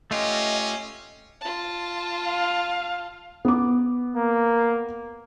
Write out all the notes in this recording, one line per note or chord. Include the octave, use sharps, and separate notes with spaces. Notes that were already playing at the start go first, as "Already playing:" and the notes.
A3 C#4 F4 G4 D#5
F4 A5
F5
B3 D6
A#3